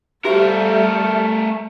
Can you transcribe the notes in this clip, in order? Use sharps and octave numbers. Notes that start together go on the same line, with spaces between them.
G3 A3 F#4 G4 A4 A#4 C5 E5